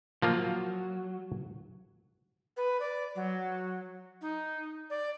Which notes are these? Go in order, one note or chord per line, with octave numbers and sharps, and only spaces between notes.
F3 F#3 A#3 F4
B4
D5
F#3
D#4
D5